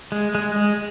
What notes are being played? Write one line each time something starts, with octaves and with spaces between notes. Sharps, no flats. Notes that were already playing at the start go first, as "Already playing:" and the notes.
G#3
G#3
G#3